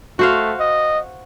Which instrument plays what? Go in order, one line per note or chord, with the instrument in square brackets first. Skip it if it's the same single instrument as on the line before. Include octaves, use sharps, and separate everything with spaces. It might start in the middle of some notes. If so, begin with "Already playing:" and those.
[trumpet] A3 [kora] F#4 C5 F5
[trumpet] D#5